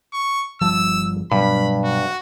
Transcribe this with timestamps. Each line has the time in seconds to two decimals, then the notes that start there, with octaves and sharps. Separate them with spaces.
0.13 C#6
0.61 G1 F3 G3 A5 E6
1.32 G2 B2 F#3 B5
1.84 F#4